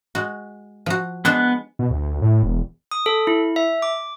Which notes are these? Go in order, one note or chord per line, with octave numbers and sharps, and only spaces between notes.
G#3 F#4
F3 F#4
G#3 B3 D4 C5 F#6
B2
D2
A2
E1
D#6
A4
E4
E5
D6